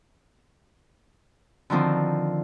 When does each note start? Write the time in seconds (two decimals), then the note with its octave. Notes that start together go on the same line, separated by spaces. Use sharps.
1.70 D3 D#3 F3 C4